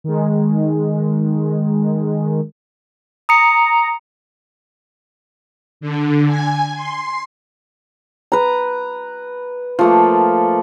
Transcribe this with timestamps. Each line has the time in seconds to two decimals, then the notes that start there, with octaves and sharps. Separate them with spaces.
0.04 D#3 G#3
3.29 A#5 D#6 C#7
5.81 D3
6.27 G#5
6.75 C6
8.32 B4 A#5
9.79 F3 A3 A#3